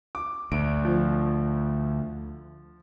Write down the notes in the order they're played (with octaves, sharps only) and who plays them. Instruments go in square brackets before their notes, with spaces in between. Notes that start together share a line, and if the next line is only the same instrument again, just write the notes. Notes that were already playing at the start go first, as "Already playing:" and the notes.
[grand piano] D6
[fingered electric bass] D2 [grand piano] D7
[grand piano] F3